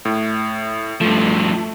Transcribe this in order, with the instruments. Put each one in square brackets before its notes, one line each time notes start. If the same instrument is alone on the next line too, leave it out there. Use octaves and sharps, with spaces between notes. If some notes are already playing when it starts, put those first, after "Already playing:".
[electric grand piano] A2
[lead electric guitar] G2 F3 [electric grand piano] A3